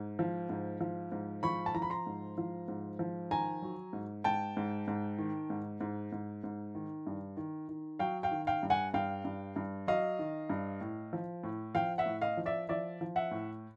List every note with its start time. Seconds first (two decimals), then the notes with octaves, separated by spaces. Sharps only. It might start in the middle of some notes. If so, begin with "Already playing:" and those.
Already playing: G#2
0.19 F3
0.50 G#2
0.81 F3
1.12 G#2
1.43 F3 B5 C#6
1.66 A5
1.74 F3 A#5
1.82 B5
1.90 A#5 C6
2.07 G#2
2.38 F3
2.68 G#2
2.99 F3
3.31 D#3 G#5 A#5
3.62 F#3
3.93 G#2
4.24 G#2 G5 A5
4.57 G#2
4.88 G#2
5.18 D#3
5.50 G#2
5.81 G#2
6.12 G#2
6.44 G#2
6.75 D#3
7.07 G2
7.37 D#3
7.69 D#3
7.99 F#3 F5 G5
8.23 F5 G5
8.31 D#3
8.47 F5 G5
8.63 G2
8.70 F#5 G#5
8.94 G2 F5 G5
9.25 G2
9.56 G2
9.88 F#3 D#5 F5
10.19 D#3
10.50 G2
10.81 A2
11.13 F3
11.44 A2
11.75 F3 F5 G5
11.98 E5 F#5
12.06 A2
12.21 D#5 F5
12.37 F3
12.46 D5 E5
12.69 F3 D5 E5
13.01 F3
13.16 E5 F#5
13.31 A2